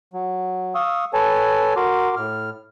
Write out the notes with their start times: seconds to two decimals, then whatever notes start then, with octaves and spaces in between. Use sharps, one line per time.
0.14 F#3
0.75 F5 C#6 D#6 E6
1.13 A4 B4 C#5 G#5 A5
1.76 F#4 A#4 C6 D6
2.17 A2 F6